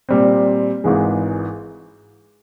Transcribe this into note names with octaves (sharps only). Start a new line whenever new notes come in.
A#2 G3 C4
G#1 G#2 E3 G#3